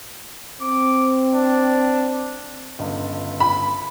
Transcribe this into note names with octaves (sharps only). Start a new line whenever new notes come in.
C4 D6
D4
G1 C#2
B5